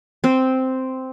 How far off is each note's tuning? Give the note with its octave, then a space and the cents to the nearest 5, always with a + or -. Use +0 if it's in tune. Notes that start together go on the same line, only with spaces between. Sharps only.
C4 -5